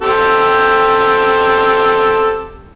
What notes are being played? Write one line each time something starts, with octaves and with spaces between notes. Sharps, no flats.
C4 G4 A4